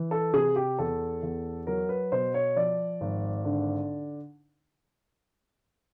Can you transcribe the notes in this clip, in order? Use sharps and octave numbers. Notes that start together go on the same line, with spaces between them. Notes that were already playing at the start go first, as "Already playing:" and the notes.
Already playing: E3
A4
C3 G#4
G4
E2 A4
E2
F#3 A#4
B4
B2 C5
C#5
F3 D5
G#1
D3